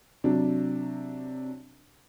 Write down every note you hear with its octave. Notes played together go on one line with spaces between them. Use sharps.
C3 F#3 D4